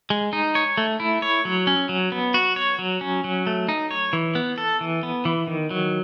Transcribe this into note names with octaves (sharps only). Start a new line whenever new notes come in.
G#3
D#4
C#5
A3
E4
C#5
F#3
C#4
F#3
B3
F#4
C#5
F#3
C#4
F#3
A3
D#4
C#5
E3
B3
A4
E3
B3
E3
D#3
F#3